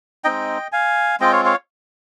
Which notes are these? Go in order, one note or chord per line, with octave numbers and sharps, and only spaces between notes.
G#3 C4 D#4 D#5 G5
F5 G#5
G#3 C4 F4 D#5 G5
C#5 F5
C#5 F5